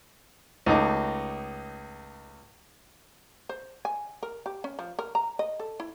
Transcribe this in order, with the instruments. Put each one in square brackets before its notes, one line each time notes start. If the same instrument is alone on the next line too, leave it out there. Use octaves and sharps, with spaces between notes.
[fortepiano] C#2 A3 D#4 D#5 D6
[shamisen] C5
G#5
A#4
G4
C#4
F3
A#4
A#5
D#5
A4
E4